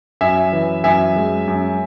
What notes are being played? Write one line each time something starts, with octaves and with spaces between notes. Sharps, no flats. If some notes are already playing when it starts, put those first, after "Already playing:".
F#2 E5 G#5
E3
F#2 E5 G#5
G#3
F#2